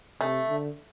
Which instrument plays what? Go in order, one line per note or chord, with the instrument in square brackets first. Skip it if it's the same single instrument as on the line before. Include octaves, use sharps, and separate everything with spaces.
[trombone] C3 [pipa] A3
[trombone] D3